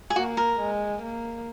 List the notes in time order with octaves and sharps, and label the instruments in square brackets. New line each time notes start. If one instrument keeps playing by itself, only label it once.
[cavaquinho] G#4
[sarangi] A#3 [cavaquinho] F#4
[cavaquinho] A#4
[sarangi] G#3
A#3